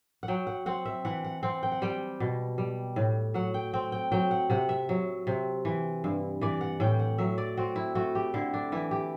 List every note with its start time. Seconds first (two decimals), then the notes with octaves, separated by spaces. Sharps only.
0.23 F#5
0.28 F#3 G5
0.47 F#5
0.66 C4 F#5
0.85 E5
1.05 E3 F#5
1.24 F#5
1.43 C4 F#5
1.63 G5
1.72 F#5
1.82 G3 G5
2.20 B2
2.58 G3
2.96 A2
3.34 F#3 F#5
3.54 G5
3.73 C4 G5
3.92 G5
4.12 F#3 G5
4.31 F#5
4.50 C3 F#5
4.69 E5
4.89 F#3
5.27 C3
5.65 E3
6.04 G2
6.41 E3 D5
6.61 F#5
6.80 A2 G5
6.99 F#5
7.18 F#3 E5
7.38 D5
7.57 C4 F#4
7.76 E4
7.95 A3 F#4
8.15 G4
8.34 D3 E4
8.54 D4
8.72 E3 E4
8.91 G4